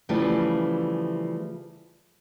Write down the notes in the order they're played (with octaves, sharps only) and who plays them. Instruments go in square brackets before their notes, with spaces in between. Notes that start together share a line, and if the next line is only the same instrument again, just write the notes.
[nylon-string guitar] C#3 E3 F3 G3 A3 A5